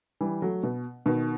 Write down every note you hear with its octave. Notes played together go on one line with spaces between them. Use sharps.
E3 G3
F#3 A3
B2
B2 D#3